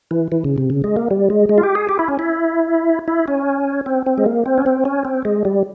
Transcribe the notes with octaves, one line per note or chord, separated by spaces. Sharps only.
E3
E3
C#3
C3
C#3
G#3
A#3
G3
G#3
G#3
F4
G4
G#4
G4
E4
C#4
E4
E4
C#4
C4
C4
G#3
A#3
C4
C#4
C4
C#4
C4
G#3
G3